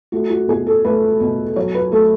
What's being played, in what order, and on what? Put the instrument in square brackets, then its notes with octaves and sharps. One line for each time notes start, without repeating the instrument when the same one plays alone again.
[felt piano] A3 F#4
F#4
B2 G#4
A4
A3 B4
B2
F#3 C#5
B4
A3 A4